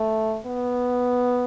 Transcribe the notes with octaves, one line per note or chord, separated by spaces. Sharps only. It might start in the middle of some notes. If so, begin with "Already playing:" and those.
Already playing: A3
B3